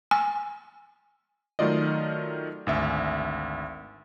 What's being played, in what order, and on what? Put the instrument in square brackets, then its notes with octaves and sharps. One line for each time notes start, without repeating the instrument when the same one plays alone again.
[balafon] G#5
[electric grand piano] D#3 F#3 A3 F4 D5 D#5
G#1 D2 E5